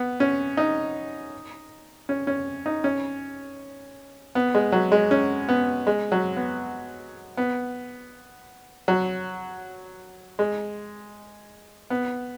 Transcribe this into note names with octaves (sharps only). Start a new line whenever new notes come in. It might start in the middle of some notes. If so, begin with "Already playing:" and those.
Already playing: B3
C#4
D#4
C#4
C#4
D#4
C#4
B3
G#3
F#3
G#3
C#4
B3
G#3
F#3
B3
B3
F#3
G#3
B3